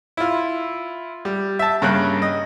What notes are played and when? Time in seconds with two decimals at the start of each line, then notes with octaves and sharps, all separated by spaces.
0.17 E4 F4
1.25 G3
1.59 E5 A5
1.82 G2 C#3 A#3 F#6
2.22 D#5